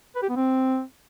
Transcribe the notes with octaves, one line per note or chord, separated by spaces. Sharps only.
B4
G4
B3
C4